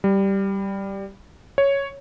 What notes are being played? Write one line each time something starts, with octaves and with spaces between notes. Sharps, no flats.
G3
C#5